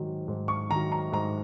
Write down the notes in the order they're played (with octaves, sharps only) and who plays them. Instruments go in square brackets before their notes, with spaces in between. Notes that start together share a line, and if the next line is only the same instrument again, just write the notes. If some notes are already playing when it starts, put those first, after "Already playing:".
Already playing: [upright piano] G#2 D#3 F#3
G#2
C#6
D#3 F#3 A#5
A#5
G#2 A#5